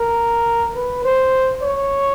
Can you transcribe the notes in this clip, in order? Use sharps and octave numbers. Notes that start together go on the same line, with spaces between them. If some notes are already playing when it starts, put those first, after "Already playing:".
Already playing: A#4
B4
C5
C#5